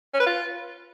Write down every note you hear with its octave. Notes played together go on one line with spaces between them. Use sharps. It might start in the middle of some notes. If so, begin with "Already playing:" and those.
C#4
B4
F4